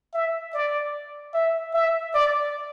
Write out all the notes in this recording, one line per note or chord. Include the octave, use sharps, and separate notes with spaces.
E5
D5
E5
E5
D5